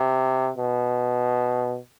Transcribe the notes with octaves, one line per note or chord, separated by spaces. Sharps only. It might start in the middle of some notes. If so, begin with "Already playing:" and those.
Already playing: C3
B2